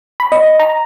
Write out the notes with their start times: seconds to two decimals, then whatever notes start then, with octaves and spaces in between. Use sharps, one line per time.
0.20 B5
0.32 D#5
0.59 A#5